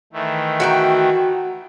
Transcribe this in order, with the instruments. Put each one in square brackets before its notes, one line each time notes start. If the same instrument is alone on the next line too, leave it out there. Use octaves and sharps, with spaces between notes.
[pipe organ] D#3 E3 A3
[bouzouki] F#4 G5 A#5